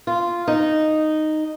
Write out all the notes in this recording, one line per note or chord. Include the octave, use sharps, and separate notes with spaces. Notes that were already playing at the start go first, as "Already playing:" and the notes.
F4
D#4